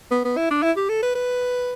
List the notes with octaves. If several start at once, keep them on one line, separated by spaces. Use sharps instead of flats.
B3
B3
E4
D4
E4
G4
A4
B4
B4